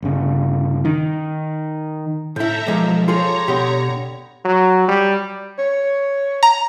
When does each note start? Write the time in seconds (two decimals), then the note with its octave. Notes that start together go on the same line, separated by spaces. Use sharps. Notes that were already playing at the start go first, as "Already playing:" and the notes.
0.02 G1 C#3
0.85 D#3
2.36 A2 E4 A4 E5 G5 A#5
2.66 B1 F3 G#3 G4 A#4
3.08 F4 G#4 A4 C#5 A#5 C6
3.48 B2 D3 G3 D#4 G4
4.45 F#3
4.88 G3
5.59 C#5
6.43 A#5